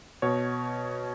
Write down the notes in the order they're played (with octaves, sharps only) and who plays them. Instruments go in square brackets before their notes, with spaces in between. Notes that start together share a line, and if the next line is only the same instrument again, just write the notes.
[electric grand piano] B2 C#5